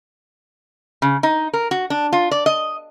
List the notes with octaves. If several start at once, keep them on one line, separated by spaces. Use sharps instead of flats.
C#3
D#4
A#4
F#4
D4
F4
D5
D#5